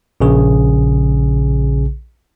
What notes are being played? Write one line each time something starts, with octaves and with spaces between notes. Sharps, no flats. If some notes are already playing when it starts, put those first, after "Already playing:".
A#1 C#3 G#4